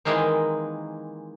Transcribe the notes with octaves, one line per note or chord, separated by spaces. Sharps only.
D#3 E3 G#3 A#3 C4